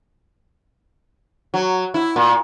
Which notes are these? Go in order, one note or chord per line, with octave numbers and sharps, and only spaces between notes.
F#3
E4
A#2